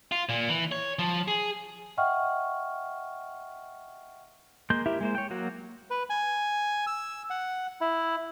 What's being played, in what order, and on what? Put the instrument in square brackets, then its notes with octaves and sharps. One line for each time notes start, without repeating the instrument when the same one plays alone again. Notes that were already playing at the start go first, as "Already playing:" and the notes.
[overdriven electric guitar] F4
A#2
E3
C#5
F3
G#4
[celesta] D#5 E5 F#5 G5 C#6 F6
[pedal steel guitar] G#3 A#3 C6 G6
E4 G4 A#4 E5
G#3 A#3 C5
C#5 G5
F#3 A#3 F#4
[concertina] B4
G#5
E6
F#5
E4